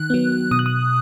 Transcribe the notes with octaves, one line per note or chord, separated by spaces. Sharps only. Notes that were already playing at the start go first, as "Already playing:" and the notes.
Already playing: D#3 F#6
F#3 B3
B2 D#6
F#6
D#6